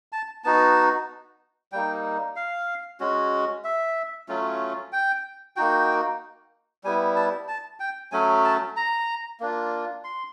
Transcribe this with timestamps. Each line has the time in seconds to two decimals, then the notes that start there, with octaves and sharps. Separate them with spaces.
0.12 A5
0.44 B3 D#4 F#4 A5
1.72 G3 A#3 D#4 G5
2.36 F5
3.00 G#3 C#4 F#4
3.64 E5
4.29 F#3 A3 C#4 F4
4.92 G5
5.56 A#3 D#4 F#4 G5
6.84 G3 B3 E4 G#5
7.16 A5
7.48 A5
7.80 G5
8.12 F#3 A3 C#4 G#5
8.44 A5
8.76 A#5
9.40 A#3 D4 F4
10.04 C6